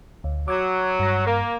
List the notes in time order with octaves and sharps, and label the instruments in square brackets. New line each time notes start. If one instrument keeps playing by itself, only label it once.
[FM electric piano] D2
[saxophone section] F#3 [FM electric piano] D6 G#6
[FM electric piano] G2 A#6
[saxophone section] A#3